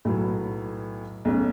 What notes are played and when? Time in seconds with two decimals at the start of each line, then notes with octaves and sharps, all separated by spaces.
0.05 B1 A2 F#3 B3
1.25 B1 B2 A3 C#4